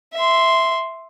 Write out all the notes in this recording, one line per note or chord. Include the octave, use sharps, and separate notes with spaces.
E5 C6